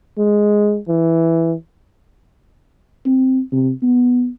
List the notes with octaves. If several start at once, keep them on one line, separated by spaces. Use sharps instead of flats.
G#3
E3
C4
C3
B3